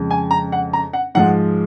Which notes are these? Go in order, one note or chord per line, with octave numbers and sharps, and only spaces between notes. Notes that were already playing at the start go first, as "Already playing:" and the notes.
Already playing: F2 C#3 G#3
G#5
A#5
F#5
A#5
F#5
G#2 F3 G#3 F#5